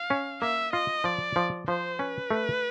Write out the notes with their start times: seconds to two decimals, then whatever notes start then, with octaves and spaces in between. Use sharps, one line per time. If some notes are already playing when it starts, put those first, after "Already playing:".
Already playing: F5
0.10 C#4
0.42 A#3 E5
0.73 F4 D#5
1.04 F3 D5
1.36 F3
1.67 F3 C5
1.99 C#4 B4
2.31 A3